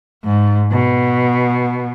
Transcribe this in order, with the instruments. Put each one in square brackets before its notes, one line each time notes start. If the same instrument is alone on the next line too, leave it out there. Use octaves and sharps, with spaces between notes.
[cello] G#2
B2